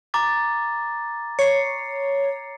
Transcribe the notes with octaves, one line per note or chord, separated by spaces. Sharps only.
A#5 D6 A6
C#5 C7 C#7